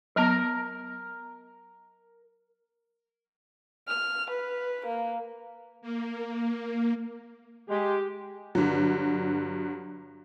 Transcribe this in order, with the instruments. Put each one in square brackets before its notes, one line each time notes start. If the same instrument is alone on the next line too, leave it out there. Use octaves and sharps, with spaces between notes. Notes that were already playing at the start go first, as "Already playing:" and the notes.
[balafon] F#3 B3 [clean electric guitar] A#4 A#5
[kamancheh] F6
B4
A#3
[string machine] A#3
[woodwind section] G#3 [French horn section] G4
[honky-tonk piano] G2 D3 F#3